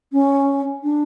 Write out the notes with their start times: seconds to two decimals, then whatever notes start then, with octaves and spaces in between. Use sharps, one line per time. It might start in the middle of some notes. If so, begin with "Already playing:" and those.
0.13 C#4
0.83 D4